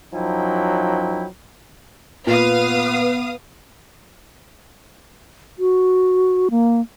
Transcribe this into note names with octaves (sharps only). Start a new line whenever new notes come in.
F#2 F3 F#3 D#4 E4 G5
A#2 B3 B4 F5 D#6
F#4
A#3